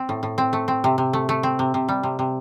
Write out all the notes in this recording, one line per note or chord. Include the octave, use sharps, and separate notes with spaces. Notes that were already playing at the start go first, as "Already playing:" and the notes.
Already playing: C4
A2
A2
C4
A3
C4
C3
C3
A3
A3
C4
C3
C3
G3
C3
C3